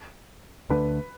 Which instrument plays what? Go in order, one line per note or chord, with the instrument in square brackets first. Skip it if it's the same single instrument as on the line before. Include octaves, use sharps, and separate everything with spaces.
[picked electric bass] D2 D3 A3 D4 [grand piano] B4